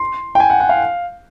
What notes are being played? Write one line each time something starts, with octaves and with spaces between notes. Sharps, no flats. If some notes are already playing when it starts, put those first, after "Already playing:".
Already playing: C6
G5
G#5
F#5
F#5
F5